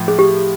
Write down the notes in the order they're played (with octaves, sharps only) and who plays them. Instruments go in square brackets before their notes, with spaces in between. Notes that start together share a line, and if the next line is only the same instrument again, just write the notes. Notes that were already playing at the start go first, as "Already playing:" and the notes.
Already playing: [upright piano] A2 F3
[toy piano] G#4
G4